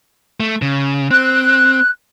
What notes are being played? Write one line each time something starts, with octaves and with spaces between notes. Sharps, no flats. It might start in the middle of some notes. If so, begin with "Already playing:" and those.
A3
C#3
C4 F#6